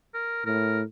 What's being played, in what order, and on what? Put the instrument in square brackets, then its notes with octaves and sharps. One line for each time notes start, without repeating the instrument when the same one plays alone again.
[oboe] A#4
[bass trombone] A2 [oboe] A#4